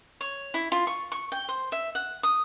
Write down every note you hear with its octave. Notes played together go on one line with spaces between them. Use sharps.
C#5
E4
F4
C#6
C#6
G5
C5
E5
F#5
D#6